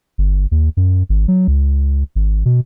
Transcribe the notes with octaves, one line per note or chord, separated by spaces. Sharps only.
G1
D#2
F#2
G#1
F#3
C#2
G#1
B2